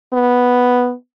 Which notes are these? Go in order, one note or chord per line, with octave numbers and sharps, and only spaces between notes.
B3